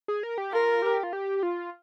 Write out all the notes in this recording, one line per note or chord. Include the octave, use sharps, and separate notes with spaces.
G#4
A#4
G4
F4 A#4
G4
F4
G4
F4